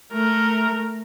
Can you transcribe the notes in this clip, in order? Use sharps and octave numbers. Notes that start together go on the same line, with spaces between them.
A3 A#4